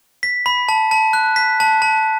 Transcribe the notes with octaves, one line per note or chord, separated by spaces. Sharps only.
B6
B5
A5
A5
F#6
B6
A5
A5